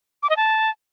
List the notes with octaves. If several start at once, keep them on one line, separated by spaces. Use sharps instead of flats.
D6
D#5
A5